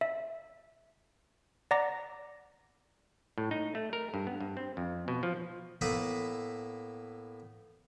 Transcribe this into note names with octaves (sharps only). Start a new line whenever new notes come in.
E5
D5 F#5 A#5 D6 A#6
A2
D#4
A3
A#4
G2
B3
G2
C4
F2
B2
F3
A2 A#3 B3 A4 E5 B5